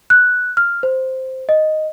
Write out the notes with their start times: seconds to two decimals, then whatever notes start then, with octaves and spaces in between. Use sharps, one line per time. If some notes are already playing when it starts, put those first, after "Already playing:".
0.10 F#6
0.57 F6
0.83 C5
1.49 D#5